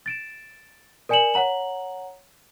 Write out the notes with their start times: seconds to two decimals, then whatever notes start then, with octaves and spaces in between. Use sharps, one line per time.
0.06 A6 D7 E7
1.09 A#4 D5 G#5 C#7 E7 F#7
1.34 C#5 F#5 A#5 F#7